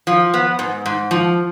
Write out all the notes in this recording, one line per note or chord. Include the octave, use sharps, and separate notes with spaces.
F3
B3
G#2
G#2
F3